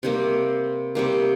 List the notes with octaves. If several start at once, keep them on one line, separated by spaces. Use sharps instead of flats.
C3 G3 A#3
C3 G3 A#3